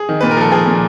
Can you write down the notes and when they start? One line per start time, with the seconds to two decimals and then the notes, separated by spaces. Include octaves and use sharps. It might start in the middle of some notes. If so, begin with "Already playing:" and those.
Already playing: G#4
0.09 D#3
0.21 A#2 B4
0.31 A#4
0.37 F3 A4
0.52 F3 G#4
0.67 A#2